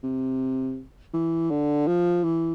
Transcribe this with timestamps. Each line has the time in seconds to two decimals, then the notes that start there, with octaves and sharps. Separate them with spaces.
0.04 C3
1.14 E3
1.51 D3
1.87 F3
2.24 E3